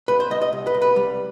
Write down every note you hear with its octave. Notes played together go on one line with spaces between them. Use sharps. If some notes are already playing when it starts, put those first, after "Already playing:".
C2 B4
C5
C2 D#5
D#5
C2
B4
C2
B4
G3